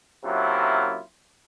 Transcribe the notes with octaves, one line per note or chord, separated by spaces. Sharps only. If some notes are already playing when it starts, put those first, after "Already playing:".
F#2 C3 F#3 A#3 E4 F4